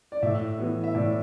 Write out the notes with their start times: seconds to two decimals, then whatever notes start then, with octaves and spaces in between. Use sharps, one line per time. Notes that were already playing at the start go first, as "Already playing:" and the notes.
0.12 D5
0.22 A2 E5
0.58 E3 B3
0.84 E5
0.95 A2 D5